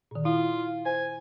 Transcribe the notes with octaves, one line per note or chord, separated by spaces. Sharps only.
A#2 D#3
E4 F4
C5 G#5